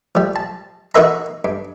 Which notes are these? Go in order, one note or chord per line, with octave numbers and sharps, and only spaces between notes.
F3 G3
A5
D#4 F#4 A#4 B4 E5 A#5
G2